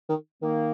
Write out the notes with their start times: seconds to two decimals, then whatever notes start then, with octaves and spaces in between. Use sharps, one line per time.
0.09 D#3
0.42 D#3 A#3